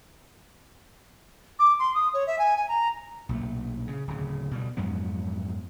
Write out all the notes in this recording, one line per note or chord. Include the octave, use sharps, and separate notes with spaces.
D6
C6
D#6
C#5
E5
G#5
G#5
A#5
B1 A#2 A3
C#3
D1 C#3
B2 G3
F2 G#2 F#3 B3